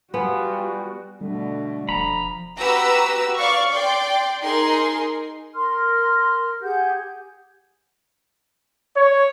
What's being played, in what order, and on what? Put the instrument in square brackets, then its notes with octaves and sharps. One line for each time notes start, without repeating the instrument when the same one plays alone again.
[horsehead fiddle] G3 F#4 [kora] B3 [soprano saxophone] F4 [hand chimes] G#5 B5
[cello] B2 A3 [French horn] D3 [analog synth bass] G3
[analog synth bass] F1 [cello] F3 [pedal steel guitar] A#5 B5
[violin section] F#4 G4 B4 A#5 E6
D5 F5 C#6
D5 G5 C6
D#4 G#4 A#4 C6
[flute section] A#4 C6 F6
G4 G#4 F#5 G6
[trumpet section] C#5